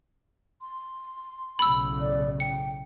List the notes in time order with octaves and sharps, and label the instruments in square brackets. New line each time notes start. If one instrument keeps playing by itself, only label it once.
[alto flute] C6
[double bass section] B1 A2 C#3 [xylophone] B5 E6
[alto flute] D5
[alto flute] G5 [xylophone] C#7